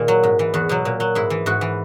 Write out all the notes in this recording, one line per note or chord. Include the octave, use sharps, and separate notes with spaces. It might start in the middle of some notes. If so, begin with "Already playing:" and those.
Already playing: A#2 D#3 G#4
F#3
G#2
E3
E2 F#4
B2 F#3
A#2
F#3
G#2 E4
E3
G#2 F#4
E3